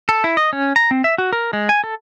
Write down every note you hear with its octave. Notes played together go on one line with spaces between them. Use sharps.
A4
E4
D#5
C#4
A#5
C4
E5
F#4
A#4
G#3
G#5
A4